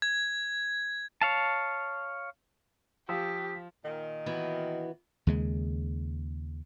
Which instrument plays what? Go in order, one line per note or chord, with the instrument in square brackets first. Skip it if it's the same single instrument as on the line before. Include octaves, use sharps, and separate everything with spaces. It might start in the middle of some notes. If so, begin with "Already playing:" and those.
[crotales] G#6
[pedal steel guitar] C#5 F5 A5
[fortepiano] F3 [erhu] G4 [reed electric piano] F5 D#6 E6 [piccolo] B6
[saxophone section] A#2 D#3
[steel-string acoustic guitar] E3 B3 F#4
[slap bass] D#2 C#3 G#3